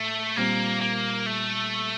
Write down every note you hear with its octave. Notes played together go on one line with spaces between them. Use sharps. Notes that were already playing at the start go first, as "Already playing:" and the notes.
Already playing: A2 A3
A#2 G3 A#3 C4
A#3
A3